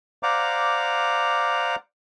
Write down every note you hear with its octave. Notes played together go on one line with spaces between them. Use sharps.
C5 D5 F5 F#5 A#5 D6